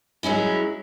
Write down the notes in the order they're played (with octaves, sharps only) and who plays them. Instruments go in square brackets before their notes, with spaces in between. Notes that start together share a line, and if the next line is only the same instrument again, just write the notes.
[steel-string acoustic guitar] F#3 G#3 C#4 E4